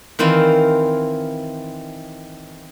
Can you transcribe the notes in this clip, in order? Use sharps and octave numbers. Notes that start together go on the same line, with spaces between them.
D#3 E3 C4 E4 F4